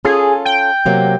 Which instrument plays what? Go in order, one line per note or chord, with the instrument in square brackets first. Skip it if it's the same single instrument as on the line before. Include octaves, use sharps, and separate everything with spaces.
[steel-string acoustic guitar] C#4 F4 A4 [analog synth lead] G#4
[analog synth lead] G5
[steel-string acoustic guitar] C3 F#3 A#3